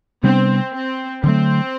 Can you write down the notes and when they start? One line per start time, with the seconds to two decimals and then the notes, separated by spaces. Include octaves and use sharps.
0.23 C3 G3 B3 C4 D4
0.73 C4
1.24 D3 F#3 A3 C4